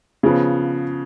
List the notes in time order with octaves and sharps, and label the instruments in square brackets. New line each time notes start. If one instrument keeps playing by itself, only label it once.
[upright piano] C#3 F3 B3